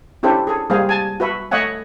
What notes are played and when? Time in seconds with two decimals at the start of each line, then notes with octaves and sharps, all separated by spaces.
0.23 C#4 D4 E4 G4 A4 C5
0.47 G#4 A4
0.70 G3 G#3 A#3 G#4 C5 F5
0.89 G#5 A5
1.20 F#4 B4 E5
1.51 A3 C#5 D#5 E5 F#5 G#5